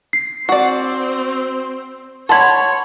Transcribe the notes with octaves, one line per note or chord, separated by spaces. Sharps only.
C7
C4 F#4 D5
A4 C#5 F#5 B5 C6 G#6